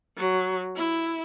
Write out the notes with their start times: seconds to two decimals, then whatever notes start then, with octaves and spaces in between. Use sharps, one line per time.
0.17 F#3
0.76 E4